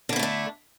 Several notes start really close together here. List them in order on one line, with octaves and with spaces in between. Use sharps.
D3 E4 C4 A3 D4